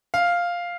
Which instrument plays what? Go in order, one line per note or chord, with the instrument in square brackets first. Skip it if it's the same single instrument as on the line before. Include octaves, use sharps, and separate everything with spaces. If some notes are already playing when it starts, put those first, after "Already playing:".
[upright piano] F5